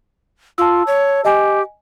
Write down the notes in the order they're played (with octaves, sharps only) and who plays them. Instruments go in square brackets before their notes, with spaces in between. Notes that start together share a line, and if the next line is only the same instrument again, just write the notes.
[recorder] F4 [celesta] A5 E6
[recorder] C#5
[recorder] G4 [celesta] D#5 G#5